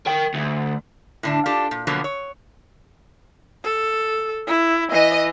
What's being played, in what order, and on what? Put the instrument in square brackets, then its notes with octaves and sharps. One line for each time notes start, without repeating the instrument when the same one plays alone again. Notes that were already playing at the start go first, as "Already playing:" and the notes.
[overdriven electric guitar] A#4 G5
D2
[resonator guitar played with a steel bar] A2 D3 D4
D4 F4 G4 A4
A#2
B2 D3 F3 F#3 A#3 B3
C#5
[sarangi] A4
E4
[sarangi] E3 [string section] D#5